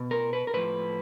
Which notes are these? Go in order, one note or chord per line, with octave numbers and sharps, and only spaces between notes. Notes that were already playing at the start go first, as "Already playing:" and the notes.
Already playing: B2
A#4
B4
A#4
A2 F3 B4